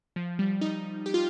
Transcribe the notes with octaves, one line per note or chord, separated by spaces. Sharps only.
F3
G3
D#4
G4
F4